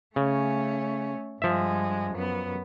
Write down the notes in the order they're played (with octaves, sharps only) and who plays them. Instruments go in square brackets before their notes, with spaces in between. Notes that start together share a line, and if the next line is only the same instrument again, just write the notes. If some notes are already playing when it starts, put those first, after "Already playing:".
[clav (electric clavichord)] C#3 [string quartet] A3 C#4
[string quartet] G2 G#3 [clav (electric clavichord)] F3 E5
[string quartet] F#2 B3